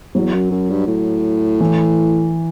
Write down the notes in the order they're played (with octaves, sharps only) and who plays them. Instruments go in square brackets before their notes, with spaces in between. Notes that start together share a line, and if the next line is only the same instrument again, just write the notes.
[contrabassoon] E2 [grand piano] F#3
[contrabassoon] F#2
F#2
G2
A2
[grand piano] E3